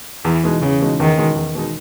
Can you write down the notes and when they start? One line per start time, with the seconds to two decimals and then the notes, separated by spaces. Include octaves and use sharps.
0.25 E2 E3
0.44 B2 G#3 D#4
0.61 E2 C#3
0.81 B2 G#3 D#4
0.99 E2 D#3
1.17 B2 G#3 D#4
1.36 E2
1.55 B2 G#3 D#4